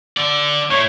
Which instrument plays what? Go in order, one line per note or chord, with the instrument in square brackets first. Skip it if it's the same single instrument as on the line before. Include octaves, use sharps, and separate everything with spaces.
[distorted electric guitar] D3 D5
[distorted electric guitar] A2 [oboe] C#5